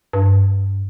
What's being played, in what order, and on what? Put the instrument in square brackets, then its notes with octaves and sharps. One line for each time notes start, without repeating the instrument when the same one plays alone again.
[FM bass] G2